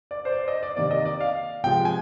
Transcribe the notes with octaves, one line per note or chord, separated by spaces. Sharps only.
D5
C5
D5
D#5
D5
C3 D#3 A#3 D5
D#5
D5
F5
C3 F3 G#3 G5
G#5